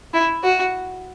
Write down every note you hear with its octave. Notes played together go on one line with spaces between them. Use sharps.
E4
F#4